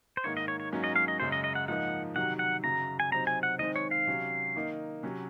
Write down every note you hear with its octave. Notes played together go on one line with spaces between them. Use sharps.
C5
G#2 D#3 A#3 D#4 C#5
D#5
C#5
C#5
G#2 F#3 A#3 C#4
D#5
F5
D#5
F#2 C#3 G#3 C5
D#5
D#5
F#5
G#2 F3 A#3 D#4 F#5
C3 D#3 F#3 F#5
F#5
F#2 C#3 F#3 A#5
G#5
C3 F#3 C4 D#4 A#5
G#5
F#5
D#3 G#3 C4 D#4 D#5
C#5
F5
C3 F#3 C#4
D#3 A#3 D#4
C3 F#3 C#4